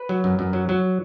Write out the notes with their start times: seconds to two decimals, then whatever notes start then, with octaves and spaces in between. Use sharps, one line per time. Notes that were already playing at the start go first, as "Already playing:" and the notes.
Already playing: B4
0.09 F#3
0.24 F#2
0.39 F#2
0.53 F#3
0.69 F#3